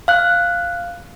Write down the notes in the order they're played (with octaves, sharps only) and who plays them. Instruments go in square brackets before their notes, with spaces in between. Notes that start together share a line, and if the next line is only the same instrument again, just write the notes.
[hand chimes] F5 F#6